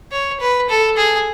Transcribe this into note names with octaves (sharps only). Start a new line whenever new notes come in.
C#5
B4
A4
G#4